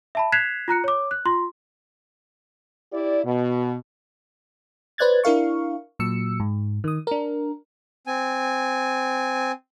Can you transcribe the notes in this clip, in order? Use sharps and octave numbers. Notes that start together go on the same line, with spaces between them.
E5 A5 B5
F#6 G#6 B6 C7 E7 F7
F4 A#5 F#6 C#7
C#5 D6
F#6
F4 C6
E4 G4 D5
B2
B4 C5 D5 F#6 G#6 A6
D4 E4 A#4 F5 C#6
A#2 F#3 E6 C#7
G#2
D#3 D#6
D4 A#4
C4 G#5